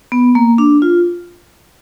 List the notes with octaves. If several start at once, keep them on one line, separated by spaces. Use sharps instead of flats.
B3
A#3
D4
F4